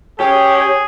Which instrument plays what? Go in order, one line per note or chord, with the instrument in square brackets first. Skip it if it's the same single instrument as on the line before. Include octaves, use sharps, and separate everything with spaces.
[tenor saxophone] C#4 [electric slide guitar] G4 [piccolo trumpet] G#4 [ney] C#5